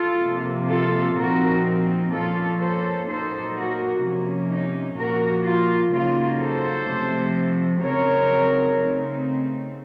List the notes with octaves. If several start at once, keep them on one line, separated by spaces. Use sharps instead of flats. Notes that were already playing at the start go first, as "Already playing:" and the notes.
Already playing: F4 A4
C3 F3 A#3
F4 A4
A#2 F3 C4 D#4 F#4 A#4
A#2 F3 A#3 C#4 F4 A4
A4 C5
A#2 F#3 A#3 D#4 A4 C5
F#4 A#4
C3 F3 A#3 C#4
D#4
A#2 F3 A#3 F#4 A#4
F4
C#3 F#3 A#3 D#4 F4
A4 C5
C3 F3 A3
C#3 F#3 C4 D#4 A#4 C#5
C#3 A3 C4 D#4